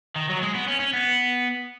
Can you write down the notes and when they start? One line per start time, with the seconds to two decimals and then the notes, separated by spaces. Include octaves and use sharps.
0.16 D#3
0.30 F#3
0.42 G#3
0.55 B3
0.68 C#4
0.80 C#4
0.93 B3